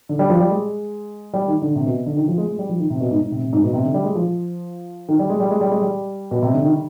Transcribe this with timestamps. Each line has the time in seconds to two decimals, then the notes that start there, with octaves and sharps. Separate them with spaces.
0.09 D3
0.19 G3
0.30 F3
0.40 G3
0.51 G#3
1.33 G3
1.48 D#3
1.62 D3
1.75 C3
1.86 B2
2.06 D3
2.17 D#3
2.28 F3
2.38 G#3
2.48 G#3
2.59 G3
2.69 F3
2.79 D#3
2.90 C3
3.00 B2
3.11 G#2
3.21 G#2
3.32 C3
3.42 C3
3.53 G#2
3.63 B2
3.73 C3
3.84 D3
3.94 G3
4.04 G#3
4.15 F3
5.09 D#3
5.19 G3
5.30 G#3
5.40 G3
5.51 G#3
5.61 G3
5.71 G#3
5.82 G3
6.31 B2
6.42 C3
6.53 D3
6.64 D#3